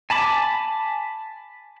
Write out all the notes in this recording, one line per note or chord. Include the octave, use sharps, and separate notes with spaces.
G#5 A5 B5 D6